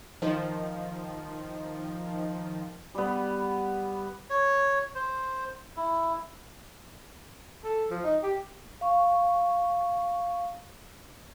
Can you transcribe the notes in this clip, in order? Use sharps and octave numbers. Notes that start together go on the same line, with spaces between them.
D#3 F3
G3 B3
C#5
C5
E4
A4
F3
D#4
G4
F5 C#6